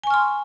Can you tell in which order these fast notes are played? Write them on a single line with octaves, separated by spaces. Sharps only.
G#5 C#6 F6 C6